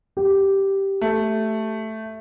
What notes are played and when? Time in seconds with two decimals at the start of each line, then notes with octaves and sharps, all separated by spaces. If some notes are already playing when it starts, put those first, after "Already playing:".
0.17 G4
1.01 A3